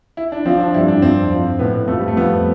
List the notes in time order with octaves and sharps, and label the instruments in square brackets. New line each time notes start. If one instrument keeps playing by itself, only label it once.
[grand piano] E4
D4
[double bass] F3 [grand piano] C4
[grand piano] D4
[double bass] G2 [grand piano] E4
[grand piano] D4
[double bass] F2 [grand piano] C4
[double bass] F2
[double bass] A2 [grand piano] B3
[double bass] F2 [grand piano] A3
[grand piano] G3
A3
[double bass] F2 [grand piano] B3